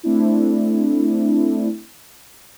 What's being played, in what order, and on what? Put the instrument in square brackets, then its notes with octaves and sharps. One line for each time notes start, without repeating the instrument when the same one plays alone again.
[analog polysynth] A3 C4 D4 E4